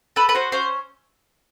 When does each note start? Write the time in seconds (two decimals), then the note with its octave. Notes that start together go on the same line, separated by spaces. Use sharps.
0.16 A4 B4
0.29 B4
0.35 F#4 C5
0.52 C#4 C5